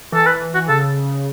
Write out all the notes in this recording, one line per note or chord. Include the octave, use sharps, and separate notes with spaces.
E3 A4
B4
F#4
C#3 A4